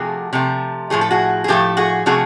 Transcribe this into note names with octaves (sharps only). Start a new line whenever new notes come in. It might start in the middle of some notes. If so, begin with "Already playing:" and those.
Already playing: C3 F3 A3 F#4 G#4
C3 F3 A3
A2 F3 A3 G#4
A4
F#4 G#4
G#4
A2 F3 A3 G4 A4
F#4 G#4
C3 F3 A3 F#4 G#4